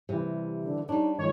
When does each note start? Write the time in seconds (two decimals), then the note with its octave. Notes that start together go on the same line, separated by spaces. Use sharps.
0.09 C3 E3 G3
0.62 D3
0.89 G3 D4 D#4 C#5
1.19 D#3 F3 G#3 C#5